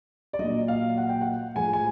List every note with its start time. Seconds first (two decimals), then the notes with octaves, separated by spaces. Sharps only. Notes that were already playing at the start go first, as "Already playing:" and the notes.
0.33 D5
0.39 A#2 F#3 D#5
0.68 F5
0.98 F#5
1.09 G5
1.21 F#5
1.55 A2 F3 G#3 G#5
1.73 G#5